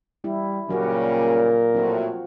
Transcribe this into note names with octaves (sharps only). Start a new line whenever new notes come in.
G3 E4
A#2 C#3 F#3 G3 C#4 F#4 G4 A#4
A2 F#3 C4 F4 F#4